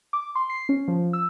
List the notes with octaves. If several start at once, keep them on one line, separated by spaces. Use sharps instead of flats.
D6
C6
C7
C#4
F3
E6